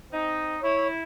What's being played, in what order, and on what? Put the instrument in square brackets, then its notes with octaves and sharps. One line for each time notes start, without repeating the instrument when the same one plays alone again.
[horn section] C4 D#4
[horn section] E4 [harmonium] C#5